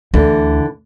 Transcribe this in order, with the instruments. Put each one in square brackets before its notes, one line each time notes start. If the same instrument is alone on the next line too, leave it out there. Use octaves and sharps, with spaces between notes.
[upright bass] D2 [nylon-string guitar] D3 E3